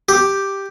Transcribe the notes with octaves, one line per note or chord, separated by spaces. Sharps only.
G4